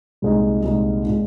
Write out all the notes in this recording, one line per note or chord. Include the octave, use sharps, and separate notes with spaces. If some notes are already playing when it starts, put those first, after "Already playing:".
C2 A#2 G#3 D#4
C2 A#2 G#3 D#4
A#2 G#3 D#4